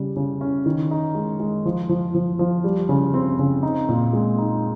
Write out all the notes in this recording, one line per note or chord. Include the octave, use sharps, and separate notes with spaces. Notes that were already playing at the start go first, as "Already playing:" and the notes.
Already playing: C#3 G3
C#3
C#4
D#3
D#4
G#3
G#3
F3
F3
F3
F3
G3
C#3
C4
C#3
D#4
A#2
G#3
D#4